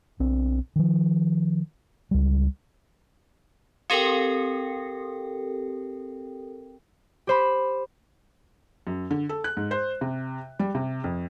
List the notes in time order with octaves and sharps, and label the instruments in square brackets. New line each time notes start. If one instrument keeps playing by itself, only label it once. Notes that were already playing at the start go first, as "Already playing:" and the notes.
[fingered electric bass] B1 C4 D4
D#3 F3
C#2 G3
[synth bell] C4 G4 A4 A#4 G5
[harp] G4 C5 B5
[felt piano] F#2
D3
A4
F#6
G#2
C5
C3
G3
C3
F2